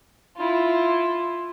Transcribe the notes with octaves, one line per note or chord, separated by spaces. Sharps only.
E4 F4